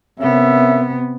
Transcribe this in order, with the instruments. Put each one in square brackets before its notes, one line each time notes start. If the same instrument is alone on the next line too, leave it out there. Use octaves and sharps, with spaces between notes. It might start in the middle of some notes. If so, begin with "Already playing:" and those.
[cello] C3 B3 [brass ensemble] C#4 A#4 E5